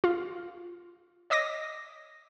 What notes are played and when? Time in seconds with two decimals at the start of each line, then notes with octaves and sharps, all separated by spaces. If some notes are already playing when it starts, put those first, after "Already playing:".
0.04 F4
1.30 C#5 D#5 D6 D#6 A#6